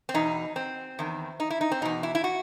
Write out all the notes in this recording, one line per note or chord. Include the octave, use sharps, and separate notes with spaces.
C4
E2 B2 D#4
C4
E2 D#3
D#4
E4
D#4
C4
E2 B2 D#4
E4
E4
F#4